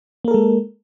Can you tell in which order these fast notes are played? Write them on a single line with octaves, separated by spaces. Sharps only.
A#3 A#4 A4 G#3